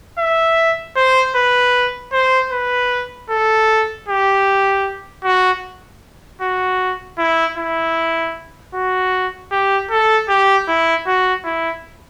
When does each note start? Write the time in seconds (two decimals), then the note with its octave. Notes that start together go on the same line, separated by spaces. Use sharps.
0.19 E5
0.96 C5
1.36 B4
2.13 C5
2.52 B4
3.30 A4
4.08 G4
5.24 F#4
6.41 F#4
7.18 E4
7.58 E4
8.74 F#4
9.51 G4
9.90 A4
10.29 G4
10.68 E4
11.07 F#4
11.45 E4